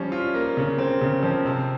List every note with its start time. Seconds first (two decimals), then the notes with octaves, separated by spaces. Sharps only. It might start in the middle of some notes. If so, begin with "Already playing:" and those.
Already playing: F3 G3 C#4
0.12 F4
0.34 A#3
0.57 C#3
0.78 C4
1.01 C#3
1.23 F3
1.46 C3